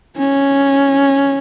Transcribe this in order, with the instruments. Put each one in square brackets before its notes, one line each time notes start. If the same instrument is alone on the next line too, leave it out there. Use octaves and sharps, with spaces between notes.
[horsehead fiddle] C#4